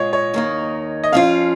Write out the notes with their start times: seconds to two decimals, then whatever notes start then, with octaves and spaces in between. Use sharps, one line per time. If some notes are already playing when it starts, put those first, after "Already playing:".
Already playing: A#2 G#3 F4 C#5 D#5
0.13 C#5
0.34 D#2 D#3 A#3 D#4
1.04 D#5
1.12 F2 F3 C#4 F4 F5